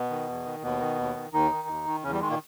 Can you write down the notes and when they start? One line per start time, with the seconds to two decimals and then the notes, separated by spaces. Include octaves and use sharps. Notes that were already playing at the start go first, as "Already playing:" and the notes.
Already playing: B2 B3
0.10 D#3
0.28 E2
0.45 D#3
0.62 D#2 B2 B3
0.80 D#3
0.98 D#2
1.15 D#3
1.33 D#2 D#3 D#4
1.51 D#3
1.68 D#2
1.86 D#3
2.03 E2 C#3 C#4
2.12 G3
2.21 D#3 G#3
2.30 A#2 A#3